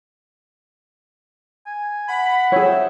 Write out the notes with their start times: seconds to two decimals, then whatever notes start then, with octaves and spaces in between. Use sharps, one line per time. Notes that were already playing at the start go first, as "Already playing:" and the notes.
1.66 G#5
2.09 F#5 B5
2.52 C4 G#4 C#5 E5